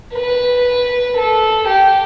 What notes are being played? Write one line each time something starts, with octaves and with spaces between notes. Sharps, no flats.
B4
A4
G4